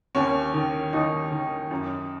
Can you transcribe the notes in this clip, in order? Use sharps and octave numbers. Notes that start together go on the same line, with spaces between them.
D#2 C#4
D#3
D#2 D#4
D#3
F#2